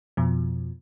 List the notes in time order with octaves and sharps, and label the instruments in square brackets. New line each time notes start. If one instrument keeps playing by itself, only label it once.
[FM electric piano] F2 B2 F3